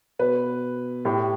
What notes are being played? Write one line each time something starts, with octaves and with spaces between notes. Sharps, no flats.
B2 B4
A2 G4